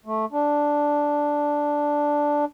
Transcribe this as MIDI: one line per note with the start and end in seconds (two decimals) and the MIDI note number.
0.06 0.25 57
0.32 2.45 62